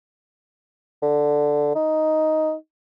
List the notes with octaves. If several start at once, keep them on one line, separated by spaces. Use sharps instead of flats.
D3
D#4